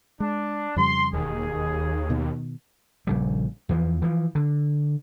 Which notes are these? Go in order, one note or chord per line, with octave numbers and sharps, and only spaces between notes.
G#3 D4
F2 C#3 G3 C6
E1 D#2 G#4
B2 D#3
A#1 C#3 G3
E2 E3 F3
E3 F3
D3